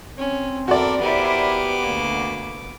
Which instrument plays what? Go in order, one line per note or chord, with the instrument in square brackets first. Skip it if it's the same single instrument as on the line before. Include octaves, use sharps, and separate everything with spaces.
[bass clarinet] C4 [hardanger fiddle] C#4
[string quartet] E2 A#4 [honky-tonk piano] F#4 D5 [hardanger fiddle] A4
[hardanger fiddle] B3 D6 [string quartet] E4 A#4 C5 [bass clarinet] G4
[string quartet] D2 A#3